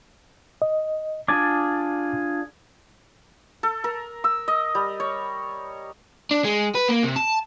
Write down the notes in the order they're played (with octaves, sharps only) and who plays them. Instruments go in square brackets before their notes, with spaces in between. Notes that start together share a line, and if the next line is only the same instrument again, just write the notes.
[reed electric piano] D#5
[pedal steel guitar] D4 F4 G#4 [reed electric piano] D6 G#6 A6
[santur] A4
A#4
E6
D#5
G3
C#5
[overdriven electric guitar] D4
G#3
B4
A#3
C3
A5